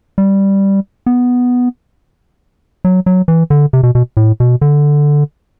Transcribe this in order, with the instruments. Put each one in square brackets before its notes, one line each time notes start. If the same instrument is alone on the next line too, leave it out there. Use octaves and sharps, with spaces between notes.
[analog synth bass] G3
B3
F#3
F#3
E3
D3
C3
B2
B2
A2
B2
D3